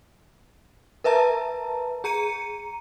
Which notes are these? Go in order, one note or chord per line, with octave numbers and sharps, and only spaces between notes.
A#4 B4 E5 A5 A#5
G#4 A#5 C#7 D#7